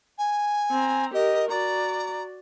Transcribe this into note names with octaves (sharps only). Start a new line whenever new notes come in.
G#5
C4 A#5
G4 A#4 D#5
F#4 D5 A#5